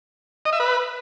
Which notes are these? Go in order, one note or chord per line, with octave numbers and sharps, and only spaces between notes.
D#5
E5
B4